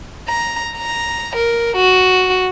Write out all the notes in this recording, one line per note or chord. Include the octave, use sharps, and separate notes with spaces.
A#5
A#5
A#4
F#4